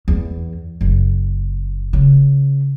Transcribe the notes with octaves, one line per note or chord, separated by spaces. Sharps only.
E2
F#1
C#3